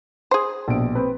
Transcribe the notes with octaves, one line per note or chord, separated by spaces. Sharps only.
G#4 C5
A#1 B2 D7
C4 B4